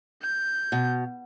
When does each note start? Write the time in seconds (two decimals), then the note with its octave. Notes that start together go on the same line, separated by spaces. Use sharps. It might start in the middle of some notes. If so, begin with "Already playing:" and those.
0.22 G6
0.72 B2